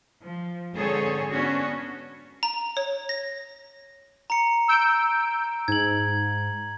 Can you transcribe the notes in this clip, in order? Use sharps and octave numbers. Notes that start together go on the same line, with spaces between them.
F3
G#2 D3 C4 G#4 A4 C#5
B3 C#4 D4 F#4
A#5
C#5
A#6
A#5 C#7
E6 G6 D7
G#2 G#6 F#7